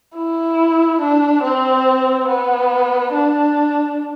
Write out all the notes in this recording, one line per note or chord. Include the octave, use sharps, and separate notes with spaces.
E4
D4
C4
B3
D4